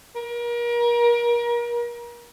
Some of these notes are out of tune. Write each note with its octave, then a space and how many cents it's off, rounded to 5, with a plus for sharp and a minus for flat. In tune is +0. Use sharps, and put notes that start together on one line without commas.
A#4 +35